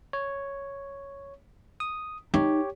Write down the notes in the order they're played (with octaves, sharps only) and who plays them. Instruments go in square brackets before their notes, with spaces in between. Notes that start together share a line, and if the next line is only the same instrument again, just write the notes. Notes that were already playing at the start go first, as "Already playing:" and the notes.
[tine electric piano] C#5
D#6
[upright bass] D#4 [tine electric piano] G4 C#5